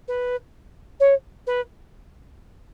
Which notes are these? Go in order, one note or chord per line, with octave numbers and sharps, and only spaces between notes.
B4
C#5
B4